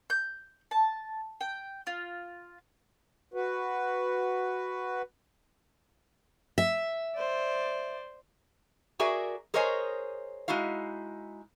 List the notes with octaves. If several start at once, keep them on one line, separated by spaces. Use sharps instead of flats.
G6
A5
G5
F4
F#4 B4
E5
C5 D5
F#4 G#4 A#4 D5 E5 G#5
G#4 A#4 C5 C#5 D#5 G#5
G#3 D#4 E4 F#4 F5